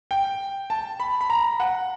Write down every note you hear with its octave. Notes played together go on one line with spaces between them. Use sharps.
G5
A5
B5
B5
A#5
F#5